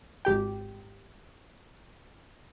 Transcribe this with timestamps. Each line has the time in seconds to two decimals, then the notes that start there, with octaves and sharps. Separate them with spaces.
0.25 G#1 G4 G5